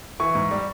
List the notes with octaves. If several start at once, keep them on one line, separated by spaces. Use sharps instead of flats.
E3 C#6
G#2
G3